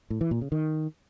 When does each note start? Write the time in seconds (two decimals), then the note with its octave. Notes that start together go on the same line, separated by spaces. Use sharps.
0.10 A2
0.21 E3
0.31 A#2
0.41 C#3
0.52 D#3